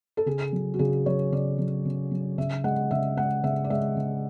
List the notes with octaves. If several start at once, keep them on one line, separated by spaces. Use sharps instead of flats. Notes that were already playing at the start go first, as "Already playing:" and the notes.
A4
C#3 G#4
F#3
F#4
C#3 G#4
F#3 C#5
C#3 D5
F#3
C#3
F#3
C#3 E5
G#3 F#5
C#3 E5
G#3 F#5
C#3 E5
D5
G#3 E5
C#3